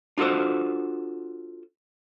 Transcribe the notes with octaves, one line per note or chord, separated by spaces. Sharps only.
D4 F4 F#4 A4 C5